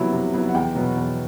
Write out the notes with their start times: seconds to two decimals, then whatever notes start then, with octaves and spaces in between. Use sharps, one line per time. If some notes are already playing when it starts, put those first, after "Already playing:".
Already playing: C3 F#3 B3 E4
0.13 C3
0.34 F#3 B3 E4
0.49 F#5
0.54 E2 G5
0.75 B2 F#3 B3
0.97 E2